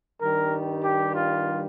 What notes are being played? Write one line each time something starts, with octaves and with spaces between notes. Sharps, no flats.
G2 D#3 G3 A#4
G4
F4